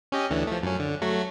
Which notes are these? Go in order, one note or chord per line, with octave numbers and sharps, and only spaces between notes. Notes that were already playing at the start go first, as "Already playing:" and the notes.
C#4 G4 D#5
D2 D3 E3
F3 A3
F#2 C#4
D3
F#3 A3 F#4